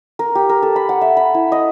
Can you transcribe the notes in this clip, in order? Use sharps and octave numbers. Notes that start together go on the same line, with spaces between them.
A#4
G4
A#4
A4
B5
F#5
E5
B5
E4
D#5